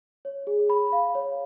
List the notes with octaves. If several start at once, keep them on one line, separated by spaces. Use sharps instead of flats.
C#5
G#4
B5
F5
C#5